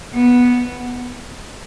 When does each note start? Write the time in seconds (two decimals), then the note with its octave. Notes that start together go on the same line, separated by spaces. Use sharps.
0.14 B3